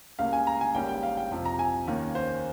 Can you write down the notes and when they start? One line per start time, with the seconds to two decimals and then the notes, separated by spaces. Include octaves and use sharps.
0.19 C#2 C#3 G3 A#3 F5
0.33 G#5
0.47 A#5
0.61 G#5
0.74 G#1 G#2 G3 A#3 C#4 G5
0.89 G5
1.03 F5
1.17 G5
1.31 F2 C3 F3
1.45 A#5
1.59 G#5
1.87 D#2 D#3 A#3 C#4
2.15 C5